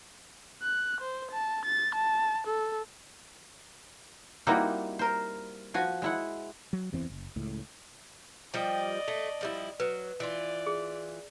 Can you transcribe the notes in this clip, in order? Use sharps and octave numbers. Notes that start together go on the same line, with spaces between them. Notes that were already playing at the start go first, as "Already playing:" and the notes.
F#6
C5
A5
A6
A5
A4
G3 A#3 C4 D#4 E4 F#4
A#4 C5
F3 F#4 G#5
G#3 E4 F#5
F#3
F#1 E2 E3 C4
F#1
C#2 A2
F3 G3 D5 D#5 G5
A3
F3 G3 E4
F#3 B4
E3 F4 D5
G#4